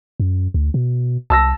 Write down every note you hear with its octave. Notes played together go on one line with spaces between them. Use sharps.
F#2
D2
B2
C2 A5 E6 A#6